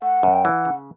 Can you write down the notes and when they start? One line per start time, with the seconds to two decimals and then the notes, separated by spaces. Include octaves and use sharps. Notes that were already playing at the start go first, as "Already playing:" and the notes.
0.02 A3 F#5
0.23 F#2
0.33 G5
0.44 E3 F#5
0.65 C#3